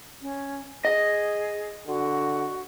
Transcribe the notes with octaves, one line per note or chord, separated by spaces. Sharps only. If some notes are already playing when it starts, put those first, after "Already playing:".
C#4
G#4 D#5
D3 F#4